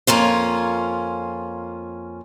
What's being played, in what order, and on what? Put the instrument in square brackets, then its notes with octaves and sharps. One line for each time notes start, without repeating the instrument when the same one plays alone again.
[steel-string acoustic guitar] F2 A#3 C#4 F4